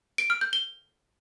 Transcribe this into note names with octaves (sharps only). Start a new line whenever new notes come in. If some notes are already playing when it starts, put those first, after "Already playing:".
D7
F6
G6
G7